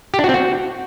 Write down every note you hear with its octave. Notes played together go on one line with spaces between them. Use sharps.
G4
D4
F#4
C4
F#4